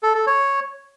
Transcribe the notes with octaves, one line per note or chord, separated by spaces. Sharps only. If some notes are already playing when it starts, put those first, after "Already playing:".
A4
A4
C#5